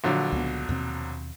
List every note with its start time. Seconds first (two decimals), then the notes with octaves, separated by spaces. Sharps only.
0.04 A#1 D3 F#3
0.32 C#2 B3
0.69 D#2 B2 C4